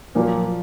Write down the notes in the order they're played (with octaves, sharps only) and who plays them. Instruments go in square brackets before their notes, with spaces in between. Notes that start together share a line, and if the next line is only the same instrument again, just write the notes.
[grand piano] A#2 F#3 A#3 [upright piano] F3